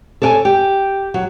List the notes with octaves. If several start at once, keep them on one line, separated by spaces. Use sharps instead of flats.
A4 C#5 D5 G5 G#5
G4
F#3